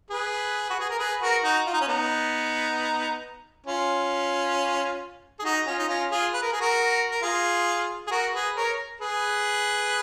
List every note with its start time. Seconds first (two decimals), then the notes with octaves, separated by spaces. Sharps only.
0.10 G#4 B4
0.70 F#4
0.80 G#4
0.90 A#4
0.99 G#4 B4
1.22 F#4 A#4
1.44 D#4 F#4
1.67 F4
1.73 D#4
1.81 C#4
1.88 B3 D#4
3.66 C#4 F4
5.39 G#4
5.44 D#4 F#4
5.66 C#4 F4
5.79 D#4
5.89 C#4 F4
6.11 F4 G#4
6.34 B4
6.42 A#4
6.52 G#4
6.61 F#4 A#4
7.11 A#4
7.22 F4 G#4
8.07 G#4
8.11 F#4 A#4
8.34 G#4 B4
8.56 A#4 C#5
9.01 G#4 B4